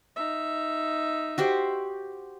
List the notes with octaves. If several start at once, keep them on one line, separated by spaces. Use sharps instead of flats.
D#4 E5
F#4 G4 C5